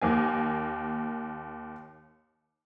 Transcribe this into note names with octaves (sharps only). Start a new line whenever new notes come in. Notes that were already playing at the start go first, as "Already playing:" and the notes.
D#2 A#3 G#5